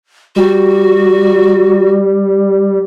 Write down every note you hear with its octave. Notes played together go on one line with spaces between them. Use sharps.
G3 F#4